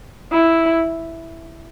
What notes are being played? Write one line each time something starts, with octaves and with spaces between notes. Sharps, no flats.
E4